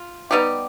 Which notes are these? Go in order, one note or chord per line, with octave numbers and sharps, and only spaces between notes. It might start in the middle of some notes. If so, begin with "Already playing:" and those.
Already playing: F4
G3 B3 D#4 G4